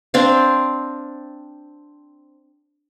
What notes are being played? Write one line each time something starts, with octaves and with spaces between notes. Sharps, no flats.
C4 D4 F5